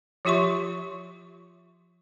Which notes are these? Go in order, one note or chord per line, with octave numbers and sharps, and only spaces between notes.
F3 F4 G4 E5 C6 C#6